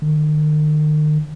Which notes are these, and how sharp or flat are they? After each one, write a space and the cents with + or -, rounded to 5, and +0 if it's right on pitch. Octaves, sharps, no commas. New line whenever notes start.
D#3 -40